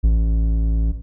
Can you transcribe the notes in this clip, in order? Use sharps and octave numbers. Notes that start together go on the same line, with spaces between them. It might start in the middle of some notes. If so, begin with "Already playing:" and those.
A1